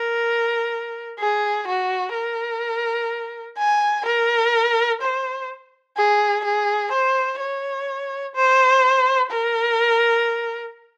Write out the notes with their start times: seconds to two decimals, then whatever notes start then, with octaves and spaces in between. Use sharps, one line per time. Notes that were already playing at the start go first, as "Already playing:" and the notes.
Already playing: A#4
1.19 G#4
1.68 F#4
2.14 A#4
3.58 G#5
4.06 A#4
5.02 C5
5.97 G#4
6.45 G#4
6.93 C5
7.40 C#5
8.35 C5
9.31 A#4